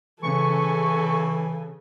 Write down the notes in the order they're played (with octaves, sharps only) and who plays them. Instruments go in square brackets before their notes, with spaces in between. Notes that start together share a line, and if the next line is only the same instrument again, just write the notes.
[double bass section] C#3 [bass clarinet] E3 [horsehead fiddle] A4 G#5 [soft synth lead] C#6